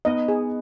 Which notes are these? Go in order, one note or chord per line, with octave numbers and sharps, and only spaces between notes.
B3 D#4 D#5
G#4